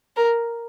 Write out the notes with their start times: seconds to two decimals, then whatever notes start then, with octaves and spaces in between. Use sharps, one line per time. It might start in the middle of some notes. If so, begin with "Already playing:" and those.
0.16 A#4